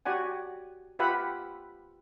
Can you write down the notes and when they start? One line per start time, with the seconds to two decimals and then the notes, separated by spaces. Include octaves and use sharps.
0.05 F#4 G4 D5 F#5 G#5
0.99 F4 G4 B4 E5 F#5 B5